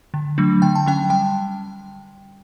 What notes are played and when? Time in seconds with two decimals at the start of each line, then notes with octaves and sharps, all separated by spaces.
0.14 D3
0.38 F#3 A3 D4
0.62 D3 G5
0.75 A5
0.86 F#3 C#4 G5
1.10 G3 G5